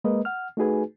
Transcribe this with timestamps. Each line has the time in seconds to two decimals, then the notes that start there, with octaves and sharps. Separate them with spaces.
0.04 G#3 A#3 A#4 B4 D#5
0.25 F#5 F6
0.57 A3 D#4 F#4 G#4 B4 G#5